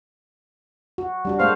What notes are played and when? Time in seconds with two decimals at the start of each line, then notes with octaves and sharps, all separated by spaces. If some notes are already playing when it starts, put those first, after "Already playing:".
0.98 F#4
1.25 G3 D4 F#4
1.40 G#3 A#3 C5 F5